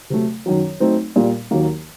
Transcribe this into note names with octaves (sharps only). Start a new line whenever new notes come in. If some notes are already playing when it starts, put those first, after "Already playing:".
C3 F#3 A3
F#2 D#3 F#3
F#3 A3 C4 D#4
A#2 G3 A#3
D#2 D#3 F#3 A#3